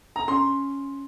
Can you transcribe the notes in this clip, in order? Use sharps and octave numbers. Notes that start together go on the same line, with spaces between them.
A#5
C#4 C6